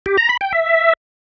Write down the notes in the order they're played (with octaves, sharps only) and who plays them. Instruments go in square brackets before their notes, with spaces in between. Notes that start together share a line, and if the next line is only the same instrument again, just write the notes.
[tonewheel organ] G4
A#5
B5
G5
E5